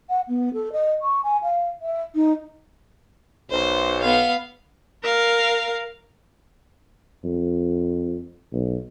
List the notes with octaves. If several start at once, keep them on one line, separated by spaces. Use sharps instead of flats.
F#5
B3
A4
D#5
C#6
G#5
F5
E5
D#4
B1 C5
B3 F5
A#4 F5
F2
B1